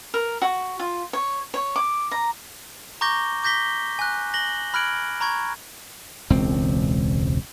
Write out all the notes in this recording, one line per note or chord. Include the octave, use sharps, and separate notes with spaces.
A#4
F#4
F4
C#5
C#5
D6
A#5
A#5 C#6 D6 G6 A#6 G7
D6 G6 A#6 B6 G7
G#5 F#6
A#6 F#7 G7
B5 F6 F#6 G#6 D7 F#7
A#5 B5 C#6 G#6
E1 C#2 C4